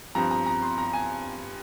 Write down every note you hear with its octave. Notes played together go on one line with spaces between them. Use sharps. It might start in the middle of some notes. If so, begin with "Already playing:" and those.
G2 F3 C4 A#5
A#5
A#5
C6
A#5
G#5